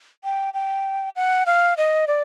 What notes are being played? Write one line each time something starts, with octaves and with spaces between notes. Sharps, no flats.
G5
G5
F#5
F5
D#5
D5